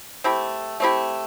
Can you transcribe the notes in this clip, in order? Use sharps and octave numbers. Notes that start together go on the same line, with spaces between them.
A3 C4 E4 G4
A3 C4 E4 G4